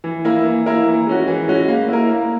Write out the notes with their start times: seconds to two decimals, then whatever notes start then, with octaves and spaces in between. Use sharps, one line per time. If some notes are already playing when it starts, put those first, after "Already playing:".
0.04 E3
0.25 A#3 E4 A#4
0.45 E3
0.66 A#3 E4 A#4
0.86 E3
1.07 G#3 C#4 F#4
1.27 E3
1.48 G#3 C#4 F#4
1.68 A#3
1.89 E4 A#4
2.09 A#3